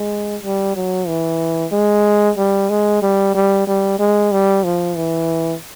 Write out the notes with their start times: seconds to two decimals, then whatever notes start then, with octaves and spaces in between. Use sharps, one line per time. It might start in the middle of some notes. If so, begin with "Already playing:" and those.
Already playing: G#3
0.43 G3
0.75 F#3
1.07 E3
1.72 G#3
2.37 G3
2.70 G#3
3.02 G3
3.34 G3
3.67 G3
3.99 G#3
4.31 G3
4.64 F3
4.96 E3